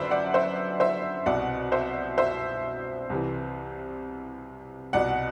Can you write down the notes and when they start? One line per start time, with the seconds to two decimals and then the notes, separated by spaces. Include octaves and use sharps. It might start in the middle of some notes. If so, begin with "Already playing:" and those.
Already playing: G1 F#2 D3 B4 C5 D5 E5
0.11 D5 F#5
0.34 C5 E5
0.80 C5 E5
1.26 C2 B2 D5 F#5
1.72 C5 E5
2.18 C5 E5
3.10 C2 C3 E3
4.93 C2 B2 D5 F#5